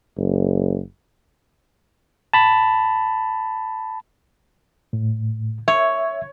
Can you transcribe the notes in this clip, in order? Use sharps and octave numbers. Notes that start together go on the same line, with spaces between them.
F#1
A5 B5
A2
C#5 E5